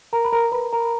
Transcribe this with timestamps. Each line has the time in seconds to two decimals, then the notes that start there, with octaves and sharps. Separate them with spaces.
0.13 A#4 A#5
0.25 B5
0.32 A#4 A#5
0.52 B4 B5
0.73 A#4 A#5